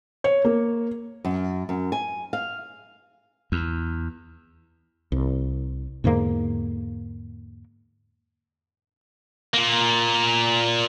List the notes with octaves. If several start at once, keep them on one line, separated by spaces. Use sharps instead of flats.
C#5
A#3
F#2
F#2
G#5
F5
E2
C2
E2 G#2 D3 A#3
A#2 A#3